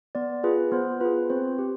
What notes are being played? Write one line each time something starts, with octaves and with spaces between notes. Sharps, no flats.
B3 D5
F4 G#4 B4
B3 C5
F4 G#4 B4
C4 C5
G4